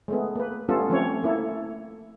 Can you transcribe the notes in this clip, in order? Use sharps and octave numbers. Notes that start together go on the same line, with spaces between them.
G#3 A3 B3
A#3 B4
G3 A3 B3 C#4 F4 A4
F3 A3 C4 C#4 C#5
A3 A#3 E4 A4